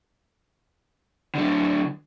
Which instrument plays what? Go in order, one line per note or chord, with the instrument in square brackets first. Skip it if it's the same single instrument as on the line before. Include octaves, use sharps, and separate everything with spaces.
[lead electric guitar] D3 F#3